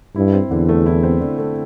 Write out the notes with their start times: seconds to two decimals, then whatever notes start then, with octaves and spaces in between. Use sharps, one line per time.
0.16 G2 E4
0.33 C4
0.51 E2 D3
0.69 A3
0.86 E4
1.03 C4
1.21 D3
1.38 A3